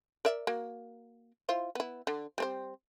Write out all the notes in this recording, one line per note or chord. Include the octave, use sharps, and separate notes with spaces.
A#4 D5 E5
A#3 F#4
E4 F4 C5
B3 E4
D3
G3 C4 C5